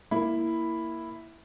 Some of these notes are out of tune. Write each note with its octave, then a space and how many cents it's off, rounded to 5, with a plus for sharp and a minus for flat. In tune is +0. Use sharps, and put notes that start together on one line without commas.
A#3 +0 E4 +0